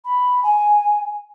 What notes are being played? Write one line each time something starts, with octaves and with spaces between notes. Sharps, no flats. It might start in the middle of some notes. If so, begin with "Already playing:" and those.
B5
G#5